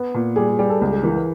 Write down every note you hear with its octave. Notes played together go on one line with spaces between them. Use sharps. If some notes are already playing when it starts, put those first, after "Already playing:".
Already playing: B3 B4
A#2
G3 G#4
G4
G3 G#4
A4
C#2 G#4
G#4
E3 A#4
B4